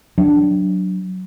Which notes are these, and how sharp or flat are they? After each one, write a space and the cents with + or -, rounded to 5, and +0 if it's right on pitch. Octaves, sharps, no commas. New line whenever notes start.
F#3 +5 D4 +0